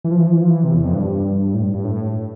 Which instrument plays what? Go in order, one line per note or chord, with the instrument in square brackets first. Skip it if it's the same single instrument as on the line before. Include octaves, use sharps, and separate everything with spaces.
[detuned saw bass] E3
F3
E3
F3
E3
F3
E3
C3
E2
F2
G2
A2
G2
G2
A2